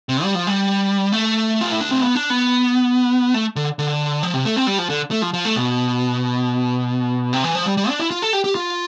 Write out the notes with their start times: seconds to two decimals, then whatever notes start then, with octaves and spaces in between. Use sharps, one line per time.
0.09 C3
0.23 G3
0.35 F3
0.47 G3
1.12 A3
1.61 F4
1.71 E4
1.81 D4
1.91 C4
2.01 B3
2.15 D4
2.30 B3
3.34 A3
3.56 D3
3.79 D3
4.23 F3
4.34 C3
4.45 A3
4.56 C4
4.67 G3
4.78 F3
4.89 D3
5.11 A3
5.22 F3
5.34 F3
5.45 A3
5.56 B2
7.33 C3
7.44 E3
7.55 F3
7.66 G3
7.77 G3
7.89 D4
8.00 E4
8.11 F4
8.22 A4
8.33 G4
8.44 G4
8.55 F4